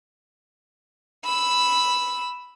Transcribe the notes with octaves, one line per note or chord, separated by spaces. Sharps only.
B5 E6